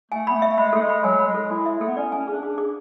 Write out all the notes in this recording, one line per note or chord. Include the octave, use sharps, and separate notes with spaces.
A3 G#5
B3 B5
A3
E5
G#3 B5
A3 A4
G#3
B5
F#3 G#5
B5
G#3
A4
E4 G#5
E5
A3 A4
B3
C#4 D5
G#5
C#4
D4 G#4
D4 G#4
G#4